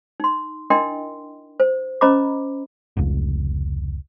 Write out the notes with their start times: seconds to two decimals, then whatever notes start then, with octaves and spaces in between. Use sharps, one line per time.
0.20 D#4 C6
0.70 D4 E4 A#4 D#5 G5 C6
1.60 C5
2.01 C#4 C5 D#5 A#5 B5 D6
2.97 F1 C#2